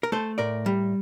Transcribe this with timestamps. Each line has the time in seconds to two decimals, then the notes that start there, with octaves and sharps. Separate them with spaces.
0.03 A#4
0.12 A3 A4 C5
0.38 A2 A#4 D5
0.66 G3